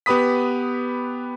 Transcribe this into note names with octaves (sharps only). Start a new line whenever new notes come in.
B3 G4 B4 B5 D#6 B6